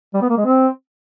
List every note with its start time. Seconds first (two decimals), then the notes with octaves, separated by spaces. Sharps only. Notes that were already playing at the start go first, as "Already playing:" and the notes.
0.14 G3
0.22 B3
0.30 A#3
0.37 G#3
0.45 C4